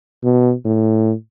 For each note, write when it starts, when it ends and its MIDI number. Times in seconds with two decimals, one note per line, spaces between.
0.24 0.54 47
0.65 1.13 45